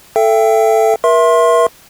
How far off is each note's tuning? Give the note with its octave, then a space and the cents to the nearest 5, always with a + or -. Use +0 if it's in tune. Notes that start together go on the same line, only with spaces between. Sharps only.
A4 +0 E5 +30 G5 +0
A#4 +40 E5 +0 C6 +25